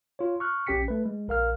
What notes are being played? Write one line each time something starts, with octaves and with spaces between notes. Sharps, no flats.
F4 C#5
C#6 F6 F#6
A#1 C#4 G4 G5 B6 C#7
A3 B4
G#3
A#1 A#4 F5 F6